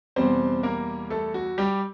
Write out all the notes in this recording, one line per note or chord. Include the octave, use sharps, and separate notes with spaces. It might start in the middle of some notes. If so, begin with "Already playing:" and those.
E2 B2 G3 C4 C5
A#3 A#4
A3 A4
F#4
G3 G4